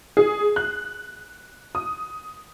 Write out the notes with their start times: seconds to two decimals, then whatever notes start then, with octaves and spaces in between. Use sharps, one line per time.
0.17 G#4
0.56 F#6
1.75 D#6